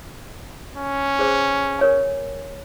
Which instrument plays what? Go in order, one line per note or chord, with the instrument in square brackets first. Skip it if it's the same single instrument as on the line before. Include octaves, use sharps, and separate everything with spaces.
[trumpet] C#4
[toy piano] G#4 C5
A#4 C#5 G#5